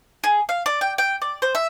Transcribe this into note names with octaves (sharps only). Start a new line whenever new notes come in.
G#4
F5
D5
G5
G5
D5
C5
E5